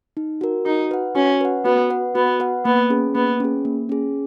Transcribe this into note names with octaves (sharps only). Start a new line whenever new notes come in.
D#4
F#4 A#4
D#4 F#4
B4 F#5
C#4 F#4
B4 F#5
B3 F#4
B4 F#5
B3 F#4
B4 F#5
A#3 B3
C#4 G#4
A#3 B3
C#4 G#4
A#3
C#4 G#4